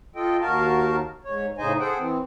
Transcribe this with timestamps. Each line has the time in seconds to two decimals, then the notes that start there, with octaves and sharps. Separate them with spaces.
0.16 F4 A4 D#5 G5
0.41 D#2 F#4 A#4 F5 A5
1.24 G#2 C#5
1.58 A2 C#3 D#4 C5 D#5 G#5
1.80 G#4 A4 C5 F#5 G5
1.98 E3 C4